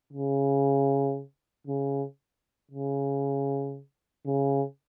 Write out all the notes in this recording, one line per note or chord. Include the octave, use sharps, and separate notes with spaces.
C#3
C#3
C#3
C#3